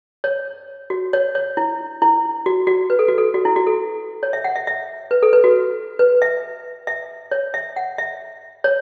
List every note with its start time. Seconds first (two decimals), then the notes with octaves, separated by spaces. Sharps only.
0.24 C#5
0.90 F#4
1.13 C#5
1.35 C#5
1.57 E4
2.02 E4
2.46 F#4
2.67 F#4
2.90 B4
2.99 A4
3.08 F#4
3.18 A4
3.34 F#4
3.45 E4
3.56 F#4
3.67 A4
4.23 C#5
4.33 E5
4.44 F#5
4.56 E5
4.67 E5
5.11 B4
5.23 A4
5.33 B4
5.44 F#4
5.99 B4
6.22 E5
6.87 E5
7.31 C#5
7.54 E5
7.76 F#5
7.98 E5
8.64 C#5